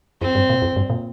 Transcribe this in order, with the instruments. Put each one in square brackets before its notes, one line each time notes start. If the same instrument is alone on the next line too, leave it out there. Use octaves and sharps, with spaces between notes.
[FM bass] F2 [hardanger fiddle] C4
[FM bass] G2
A#2
F2
G2
A#2